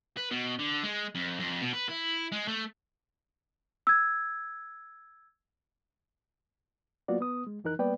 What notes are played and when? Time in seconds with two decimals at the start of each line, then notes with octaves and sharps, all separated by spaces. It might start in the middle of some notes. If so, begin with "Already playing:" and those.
0.17 B4
0.31 B2
0.59 D3
0.83 G#3
1.15 F2
1.40 F2
1.61 B2
1.73 B4
1.89 E4
2.32 G#3
2.48 A3
3.87 E6 G#6
7.08 F#3 A#3 B3 F4 F#4 D5
7.20 B3 D#6
7.47 G#3
7.64 F2 E3 D#4 A#4 F#6
7.79 G3 A#3 B3 B4 D5 G5